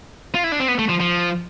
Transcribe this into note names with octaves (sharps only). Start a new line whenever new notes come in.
F4
E4
D4
C4
B3
A3
F3
F3